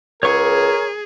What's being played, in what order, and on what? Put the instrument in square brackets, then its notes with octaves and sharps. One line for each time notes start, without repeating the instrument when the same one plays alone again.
[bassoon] C#2 [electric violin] G#4 [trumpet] A#4 [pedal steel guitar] C#5 C#6